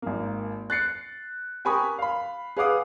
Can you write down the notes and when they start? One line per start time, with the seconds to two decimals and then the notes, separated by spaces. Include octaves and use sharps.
0.02 G#1 A#3
0.70 F#6 A6 C7 C#7
1.65 G4 A#4 G#5 B5 C#6 D#6
1.98 F5 B5
2.57 G#4 B4 F5 F#5 D6 D#6